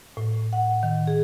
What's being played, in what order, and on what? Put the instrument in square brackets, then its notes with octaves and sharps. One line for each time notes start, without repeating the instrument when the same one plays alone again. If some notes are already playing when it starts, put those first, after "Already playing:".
[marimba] A2
F#5
D#3
G#4